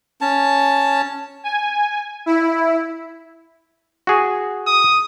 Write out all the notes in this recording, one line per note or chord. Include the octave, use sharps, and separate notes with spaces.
C#4 A5
G#5
E4
F#4 G#4
D#6